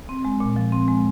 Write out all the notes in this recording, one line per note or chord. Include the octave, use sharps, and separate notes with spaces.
C4
G#3
A#2
F3
C4
G#3